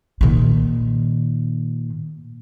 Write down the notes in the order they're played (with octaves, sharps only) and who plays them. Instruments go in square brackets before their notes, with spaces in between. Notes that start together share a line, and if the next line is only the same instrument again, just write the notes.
[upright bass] A#2 D#3